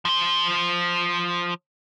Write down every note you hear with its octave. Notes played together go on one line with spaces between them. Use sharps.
F3 C5